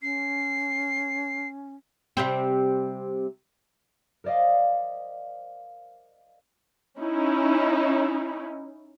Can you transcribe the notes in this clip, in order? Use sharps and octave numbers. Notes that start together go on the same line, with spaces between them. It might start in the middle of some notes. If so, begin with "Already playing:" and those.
C#4 C7
C3 G3 C4
A#4 C5 D5 D#5 F5
C#4 D#4 E4